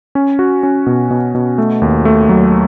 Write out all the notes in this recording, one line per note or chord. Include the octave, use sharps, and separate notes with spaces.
C#4
F#4
C#4
B2
B2
B2
A3
D#2
A3
F#3